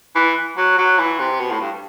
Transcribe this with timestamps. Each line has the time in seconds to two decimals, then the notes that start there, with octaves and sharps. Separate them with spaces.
0.16 E3
0.57 F#3
0.78 F#3
0.99 E3
1.19 C3
1.40 B2
1.51 A2
1.61 G2